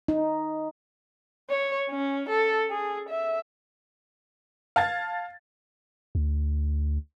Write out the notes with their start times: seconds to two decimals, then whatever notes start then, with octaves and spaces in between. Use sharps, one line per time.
0.08 D#4
1.50 C#5
1.90 C#4
2.29 A4
2.71 G#4
3.09 E5
4.76 F5 A5 G#6 A6
6.15 D2